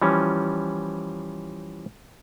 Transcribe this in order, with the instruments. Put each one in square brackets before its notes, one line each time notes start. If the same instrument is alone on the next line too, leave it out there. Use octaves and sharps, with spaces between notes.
[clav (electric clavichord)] E3 F3 G3 C#4